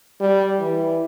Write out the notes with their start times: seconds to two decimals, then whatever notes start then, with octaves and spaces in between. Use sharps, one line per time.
0.20 G3
0.59 E3